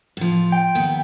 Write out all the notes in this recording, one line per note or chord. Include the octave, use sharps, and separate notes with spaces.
A2 F3
G5
D#2 B3